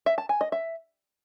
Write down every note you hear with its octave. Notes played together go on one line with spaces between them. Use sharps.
E5
A5
G#5
D#5
E5